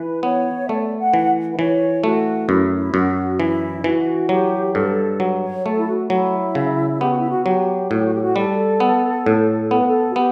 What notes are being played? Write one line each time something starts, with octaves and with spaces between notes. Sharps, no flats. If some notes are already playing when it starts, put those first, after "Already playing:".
Already playing: E3 B4
B3 C#5
E5
A3 D5
F#5
E3
B4
E3 C#5
A3 F#4
F#2 E4
E4
F#2 F#4
E3 E4
E3 F#4
F#3 G4
G2 A4
F#3
C#5
A3 A4
E4
F#4
F#3 E4
C#3
B3 G4
F#4
E4
F#4
F#3 G4
A2 F#4
G4
F#4
G4
F#4
G3 A4
B3
A2
B3 A4
B4
A4
F#4
B3 G4